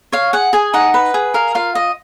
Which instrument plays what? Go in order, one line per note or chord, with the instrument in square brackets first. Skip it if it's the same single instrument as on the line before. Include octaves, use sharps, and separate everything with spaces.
[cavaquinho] C#5 F5
G#4 F#5
G#4 G#5
D#4 F#5
B4
G#4
A#4 F5
F4 F5
D#5